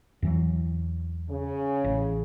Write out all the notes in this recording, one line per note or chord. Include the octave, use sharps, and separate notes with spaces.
E2 E3 F#3
C#3
A1